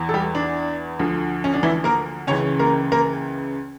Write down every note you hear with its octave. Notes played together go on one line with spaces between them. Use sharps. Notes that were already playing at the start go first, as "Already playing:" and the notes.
Already playing: E2 E3
A4
G3 G4
D4
D2 D3 F3
C#4
D4
E3 E4
A#3 A#4
C#2 C#3 E3 C#4 C#5
A#3 A#4
A#3 A#4